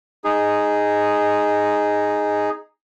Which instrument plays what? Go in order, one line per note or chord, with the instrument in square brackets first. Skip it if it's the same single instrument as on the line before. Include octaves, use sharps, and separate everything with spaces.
[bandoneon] D#4 G#4